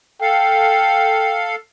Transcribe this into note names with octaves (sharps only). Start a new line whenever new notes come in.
A4 F5 G5